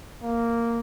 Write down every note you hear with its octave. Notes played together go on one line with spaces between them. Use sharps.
A#3